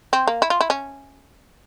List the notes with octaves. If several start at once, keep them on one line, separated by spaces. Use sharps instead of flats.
C4
A#3
E4
F4
E4
C#4